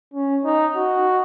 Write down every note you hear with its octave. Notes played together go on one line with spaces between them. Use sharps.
C#4
D#4
F#4